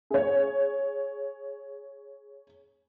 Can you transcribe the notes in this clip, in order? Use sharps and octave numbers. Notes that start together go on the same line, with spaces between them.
G#4 C#5